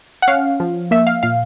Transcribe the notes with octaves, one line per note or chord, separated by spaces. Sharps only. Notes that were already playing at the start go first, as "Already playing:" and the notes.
F#5
C#4 F5
F3
A#3 E5
F5
A#2 F5